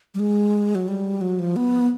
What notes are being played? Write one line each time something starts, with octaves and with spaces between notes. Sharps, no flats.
G3
G#3
F#3
G3
F#3
F3
B3